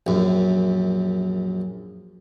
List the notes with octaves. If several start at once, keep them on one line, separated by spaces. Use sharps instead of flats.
A#1 F#2